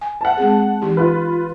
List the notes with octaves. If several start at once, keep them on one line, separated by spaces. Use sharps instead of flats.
G#5
F#5 A5
G#3 C4 G#4
E3 D#4 G4
F4 B4